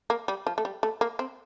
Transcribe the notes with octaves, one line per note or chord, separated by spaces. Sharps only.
A#3
G3
F3
A3
G3
A3
A#3
C4